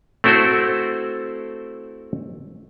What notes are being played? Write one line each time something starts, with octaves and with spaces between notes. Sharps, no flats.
A3 C4 E4 F#4 A4 C5